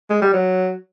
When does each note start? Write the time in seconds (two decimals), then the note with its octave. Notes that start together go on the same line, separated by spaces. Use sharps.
0.10 G#3
0.22 G3
0.34 F#3